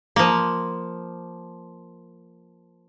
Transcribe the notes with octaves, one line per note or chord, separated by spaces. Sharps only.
F3 A#3